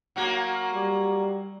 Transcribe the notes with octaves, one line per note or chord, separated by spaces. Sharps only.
F#3 A#3 F#4
G3